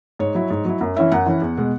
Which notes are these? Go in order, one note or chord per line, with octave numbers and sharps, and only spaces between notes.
G#2 C#5
F#3 E4
G#2
F#3 E4
F#2
E3 C#4 E4 E5
F#2 F#5
E3 C#4 E4
E2
B2 G#3